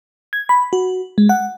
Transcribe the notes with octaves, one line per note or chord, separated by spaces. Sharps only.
G#6
B5
F#4
G#3
F#5